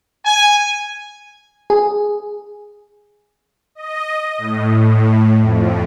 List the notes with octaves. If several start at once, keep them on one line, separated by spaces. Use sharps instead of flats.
G#5
G#4
D#5
A2
F2